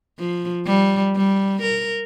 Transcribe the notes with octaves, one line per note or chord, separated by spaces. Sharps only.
F3
G3
G3
A#4